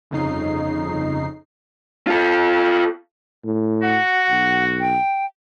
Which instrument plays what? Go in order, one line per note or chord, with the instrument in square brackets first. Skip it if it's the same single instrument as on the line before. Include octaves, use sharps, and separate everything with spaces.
[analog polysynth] G1 F2 C#3 D#4 C7
[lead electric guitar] F4 A4
[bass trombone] A2
[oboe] F#4 [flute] F#5
[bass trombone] B1
[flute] G5